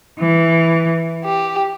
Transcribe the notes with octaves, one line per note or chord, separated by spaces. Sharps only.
E3
G4